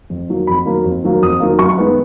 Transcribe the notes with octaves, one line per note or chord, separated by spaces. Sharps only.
F2
D#3 F#3 A#3
F2 B5
D#3 F#3 A#3
F2
D#3 F#3 A#3
F2 D#6
D#3 F#3 A#3
F#2 C#6
D#3 G#3 B3